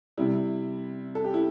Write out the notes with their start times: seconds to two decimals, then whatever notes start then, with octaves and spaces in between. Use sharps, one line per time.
0.18 C3 G3 E4
1.15 A4
1.24 G4
1.34 E4